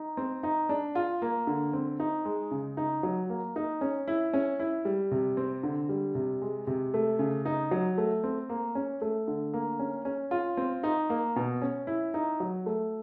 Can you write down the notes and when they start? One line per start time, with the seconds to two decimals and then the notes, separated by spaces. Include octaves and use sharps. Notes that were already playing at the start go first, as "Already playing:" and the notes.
Already playing: D#4
0.17 C4
0.43 D#4
0.69 D4
0.95 F4
1.22 A#3
1.47 D3
1.73 C4
2.00 D#4
2.25 G#3
2.51 C#3
2.77 D#4
3.03 F#3
3.29 A#3
3.56 D#4
3.81 C#4
4.08 E4
4.33 C#4
4.59 E4
4.85 G3
5.11 C3
5.37 C4
5.63 D3
5.89 G3
6.15 C3
6.41 G#3
6.67 C3
6.94 A3
7.19 C#3
7.45 D#4
7.71 F#3
7.98 A3
8.24 C4
8.49 A#3
8.75 C#4
9.01 A3
9.28 D3
9.54 A#3
9.79 C#4
10.05 C#4
10.31 F4
10.57 C4
10.83 D#4
11.10 A#3
11.36 B2
11.62 C#4
11.87 E4
12.14 D#4
12.40 F#3
12.66 A3